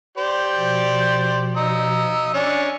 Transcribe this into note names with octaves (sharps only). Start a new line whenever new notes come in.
G4 C5 D5
B2 F3
D#5 A#5 E6
C#4 D4 G#5